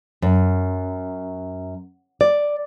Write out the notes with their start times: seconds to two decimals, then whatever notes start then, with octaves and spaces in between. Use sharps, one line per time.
0.22 F#2
2.21 D5